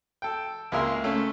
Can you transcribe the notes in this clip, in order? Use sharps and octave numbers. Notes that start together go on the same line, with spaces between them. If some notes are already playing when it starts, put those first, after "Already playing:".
A4 G5
C#2 G#3 A#3 E5 C6
A3 C#4 A4